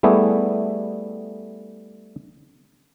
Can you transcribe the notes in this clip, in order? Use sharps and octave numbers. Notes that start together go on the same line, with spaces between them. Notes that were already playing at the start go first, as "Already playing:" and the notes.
G3 A3 B3 E4 G4 G#4